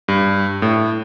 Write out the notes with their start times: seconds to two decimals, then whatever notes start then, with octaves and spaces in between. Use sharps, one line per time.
0.08 G2
0.62 A2